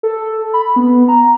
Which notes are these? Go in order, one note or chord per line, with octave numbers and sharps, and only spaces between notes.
A4
B5
B3
A#5